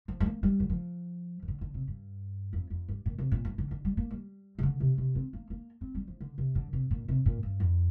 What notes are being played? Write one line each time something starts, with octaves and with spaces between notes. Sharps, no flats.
F3
G3
A#3
G3
D3
F3
F3
D3
D3
C3
G2
F2
F2
G2
A#2
C3
A#2
G2
D3
D3
G3
A#3
G3
C3
D3
C3
C3
C4
A#3
A#3
C4
G3
F3
D3
C3
D3
C3
A#2
C3
A#2
G2
F2